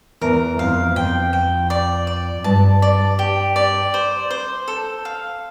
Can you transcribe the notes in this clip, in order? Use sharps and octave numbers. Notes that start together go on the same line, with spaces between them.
E2 A#4
F2 F5
F2 G5
G5
D5
D5
G2 A5
D5
G4
D5
C5
C5
A4
F5